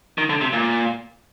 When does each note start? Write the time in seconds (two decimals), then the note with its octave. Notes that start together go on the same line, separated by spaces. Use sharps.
0.18 D#3
0.30 D3
0.41 C3
0.53 A#2